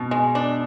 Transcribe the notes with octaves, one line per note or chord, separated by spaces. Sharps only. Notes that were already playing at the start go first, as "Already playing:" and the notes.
Already playing: B2
G#3
D4